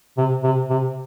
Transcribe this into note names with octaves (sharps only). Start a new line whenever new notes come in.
C3
C3
C3